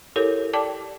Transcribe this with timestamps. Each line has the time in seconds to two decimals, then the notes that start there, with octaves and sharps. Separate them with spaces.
0.16 E4 G4 A4 A#4 C#5
0.53 D5 G5 A5 D6